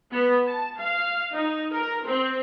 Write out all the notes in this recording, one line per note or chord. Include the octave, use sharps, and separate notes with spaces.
B3
A5
F5
D#4
A#4
C4